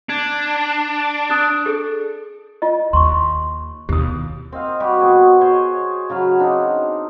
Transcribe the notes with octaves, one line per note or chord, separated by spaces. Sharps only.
D4 G#6
D#6 F#6 A6
G#4 A4
F4 D#5
D#2 C6 C#6
D#2 B2 G4 D#6
C4 D#5 F5
G3 F#4 G4
B2 G#4 C#6
C5 C#5 G#5 C6
C#3 F#3 F5 B5
C4 D4 D#4